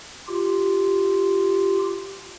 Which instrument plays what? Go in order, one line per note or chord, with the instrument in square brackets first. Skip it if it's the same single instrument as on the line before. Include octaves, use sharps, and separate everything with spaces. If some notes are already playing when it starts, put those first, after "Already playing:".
[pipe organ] F4 G4